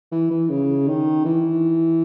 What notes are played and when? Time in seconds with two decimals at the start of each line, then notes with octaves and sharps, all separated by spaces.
0.12 E3
0.31 E3
0.50 C#3
0.88 D#3
1.25 E3